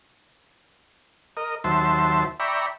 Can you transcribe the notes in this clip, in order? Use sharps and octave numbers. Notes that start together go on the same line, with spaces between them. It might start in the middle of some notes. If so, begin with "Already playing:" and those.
A#4 D#5
D#2 F#3 C5 E5 A5 C6
D5 E5 G5 A#5 B5 C#6